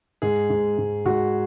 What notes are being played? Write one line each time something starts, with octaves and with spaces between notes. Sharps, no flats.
G#2 G#4
G#2
G#2
G#2 F#4